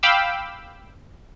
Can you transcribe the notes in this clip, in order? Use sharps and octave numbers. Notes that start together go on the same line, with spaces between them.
F5 G5 B5 D6 E6